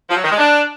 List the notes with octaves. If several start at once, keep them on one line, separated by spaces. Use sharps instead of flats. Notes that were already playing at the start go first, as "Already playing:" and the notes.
F3
F#3
D#3
G#3
D4